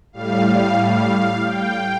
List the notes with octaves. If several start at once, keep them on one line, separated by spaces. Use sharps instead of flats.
A2 G3 F5
F5
F5
G5